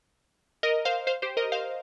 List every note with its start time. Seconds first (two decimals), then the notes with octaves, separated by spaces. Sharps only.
0.63 A#4 D#5
0.85 C5 F5
1.07 C5 F5
1.22 G4 C5
1.37 A#4 D#5
1.52 C5 F5